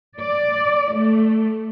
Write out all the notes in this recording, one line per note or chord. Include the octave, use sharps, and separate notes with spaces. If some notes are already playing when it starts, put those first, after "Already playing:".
D5
A3